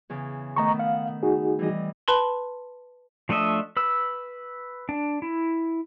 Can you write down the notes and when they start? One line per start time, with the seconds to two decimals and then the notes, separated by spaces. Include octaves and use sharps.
0.10 E2 C#3
0.56 D#3 A3 B3 D#5 A#5 C#6
0.79 F5 F#5
1.23 D#4 F#4 G#4
1.59 E3 G3 D#5
2.08 B4 A5 B5 C6
3.29 F3 A3 D4 D#5 E5
3.77 B4 E6
4.89 D4
5.22 E4